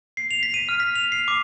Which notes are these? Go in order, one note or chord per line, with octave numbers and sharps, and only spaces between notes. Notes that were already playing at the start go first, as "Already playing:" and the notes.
C7
F7
B6
D#7
F6
B6
F7
C7
D6